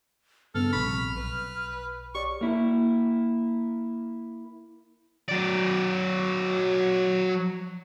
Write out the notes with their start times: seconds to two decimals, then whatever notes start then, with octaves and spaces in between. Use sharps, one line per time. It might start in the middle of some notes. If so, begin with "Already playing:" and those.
0.55 G2 C#3 B3 A4 F6
0.73 A#1 C3 B5 C#6
1.16 B1 B4
2.15 G4 C#5 D5 C#6
2.41 A#3 E4
5.29 F#3 D5